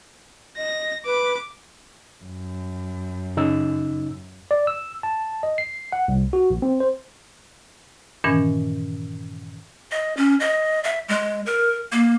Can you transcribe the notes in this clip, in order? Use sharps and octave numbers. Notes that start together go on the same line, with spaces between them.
D#5 A#6
B4 D6
F#2
C#3 D#4 E6
D5
E6
A5
D#5
C7
F#5
C2
F#4
A#1
C4
C5
G2 A#2 D#3 E3 C#4 G#5
D#5
C#4
D#5
E5
G#3
A#4
A#3